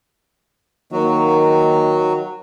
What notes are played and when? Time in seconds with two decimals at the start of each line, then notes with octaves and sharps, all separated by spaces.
0.92 D#3 F#3 A#3 F#4